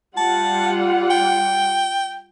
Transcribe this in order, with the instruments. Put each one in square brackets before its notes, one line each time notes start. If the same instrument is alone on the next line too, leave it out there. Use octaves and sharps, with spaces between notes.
[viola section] G3 F4 F#5 [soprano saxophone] A5
[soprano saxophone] G5